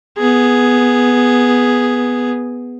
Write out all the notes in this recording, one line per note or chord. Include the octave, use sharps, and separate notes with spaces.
B3 G#4